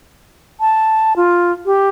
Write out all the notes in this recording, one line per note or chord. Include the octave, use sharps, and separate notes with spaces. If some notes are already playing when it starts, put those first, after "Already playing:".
A5
F4
G4